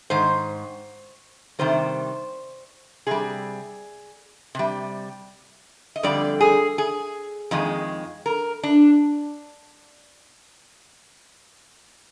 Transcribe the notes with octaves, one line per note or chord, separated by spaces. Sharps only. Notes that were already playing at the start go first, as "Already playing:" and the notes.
G#2 D#3 C5
C3 D#3 G3 C5
C3 G3 G#4
C3 G3
D#5
F2 D3 G3 D5
G#4
G#4
F2 D#3 G#3
A#4
D4